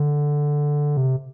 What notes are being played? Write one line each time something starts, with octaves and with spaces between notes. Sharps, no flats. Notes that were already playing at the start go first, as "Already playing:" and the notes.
Already playing: D3
C3